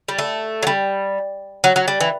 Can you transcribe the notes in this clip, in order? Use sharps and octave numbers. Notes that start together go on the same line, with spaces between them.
G3
A3
F#3
G3
F#3
F#3
G3
E3